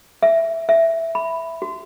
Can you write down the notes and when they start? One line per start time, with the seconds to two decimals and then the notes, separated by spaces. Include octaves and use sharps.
0.23 E5
0.69 E5
1.15 B5
1.62 F#4